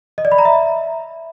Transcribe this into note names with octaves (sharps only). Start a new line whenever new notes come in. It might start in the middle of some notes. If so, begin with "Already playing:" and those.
D#5
D5
B5
A#5
E5